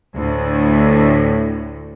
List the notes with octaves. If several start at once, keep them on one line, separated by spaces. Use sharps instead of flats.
D2 A2